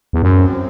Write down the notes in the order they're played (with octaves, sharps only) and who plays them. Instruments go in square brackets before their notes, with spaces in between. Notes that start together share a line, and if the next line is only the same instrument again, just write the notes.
[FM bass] E2
[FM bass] F#2 [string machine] C4